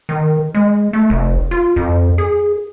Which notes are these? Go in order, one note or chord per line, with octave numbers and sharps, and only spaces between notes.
D#3
G#3
A3
F1
F4
F2
G#4